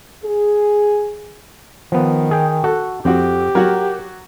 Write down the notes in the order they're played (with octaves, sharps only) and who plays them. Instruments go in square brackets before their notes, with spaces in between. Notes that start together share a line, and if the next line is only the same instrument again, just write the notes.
[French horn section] G#4
[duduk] D#3 [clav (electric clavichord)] F3 B3
[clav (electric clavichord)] G#4 G5
[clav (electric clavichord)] F#4 [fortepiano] A4
[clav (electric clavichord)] F2 [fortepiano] C4 F#4 [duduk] G4
[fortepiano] F#3 F#4 [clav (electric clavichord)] A#4